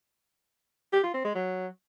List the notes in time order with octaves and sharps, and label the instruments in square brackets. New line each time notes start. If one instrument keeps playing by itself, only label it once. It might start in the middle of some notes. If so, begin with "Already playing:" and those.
[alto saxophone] G4
F4
C4
G#3
F#3